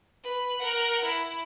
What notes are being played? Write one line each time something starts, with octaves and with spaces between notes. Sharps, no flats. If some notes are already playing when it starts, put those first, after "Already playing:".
B4
A#4 F#5
E4